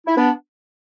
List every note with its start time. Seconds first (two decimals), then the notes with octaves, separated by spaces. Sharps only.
0.07 E4
0.17 B3 D4